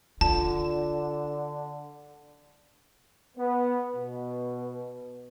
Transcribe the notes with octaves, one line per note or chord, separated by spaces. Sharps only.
D3 F4 A5
B3
B2